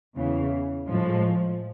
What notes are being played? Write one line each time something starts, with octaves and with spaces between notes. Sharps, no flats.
E2 C#3 E3
A2 F3 G#3